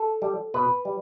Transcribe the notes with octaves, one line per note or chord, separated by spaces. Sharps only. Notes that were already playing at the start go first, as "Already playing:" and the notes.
Already playing: A4
G3
B2 B4
G3